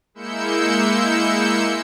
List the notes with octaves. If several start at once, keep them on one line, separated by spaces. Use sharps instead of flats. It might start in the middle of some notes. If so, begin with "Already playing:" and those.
G#3 A#3 E4 E6 G6 C#7